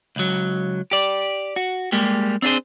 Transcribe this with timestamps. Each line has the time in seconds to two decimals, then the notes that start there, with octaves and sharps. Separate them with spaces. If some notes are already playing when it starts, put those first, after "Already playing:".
0.16 C#2 F#3
0.91 G4 D5
1.56 F#4
1.92 G3 G#3 A#3 G4
2.42 C4 D4 F4 G#4 C5